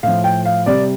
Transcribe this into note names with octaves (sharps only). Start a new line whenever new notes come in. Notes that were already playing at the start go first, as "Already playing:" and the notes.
A2 F3 F5
G5
F5
C3 G3 D5